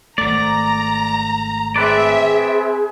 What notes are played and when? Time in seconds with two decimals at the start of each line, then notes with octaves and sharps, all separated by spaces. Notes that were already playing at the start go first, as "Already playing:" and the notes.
0.18 G#1 A3 D5 A#5
1.76 C4 G#4 B4 D5 E5